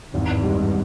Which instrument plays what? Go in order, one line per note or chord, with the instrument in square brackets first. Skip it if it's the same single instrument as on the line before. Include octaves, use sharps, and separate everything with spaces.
[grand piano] G#1 [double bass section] E2 G2
[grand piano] G#2 G3